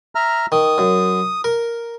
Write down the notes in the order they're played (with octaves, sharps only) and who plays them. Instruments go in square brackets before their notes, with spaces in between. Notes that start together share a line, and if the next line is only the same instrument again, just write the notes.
[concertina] E5 A#5 F6
[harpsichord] D#3 [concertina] D#6
[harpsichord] F#2
A#4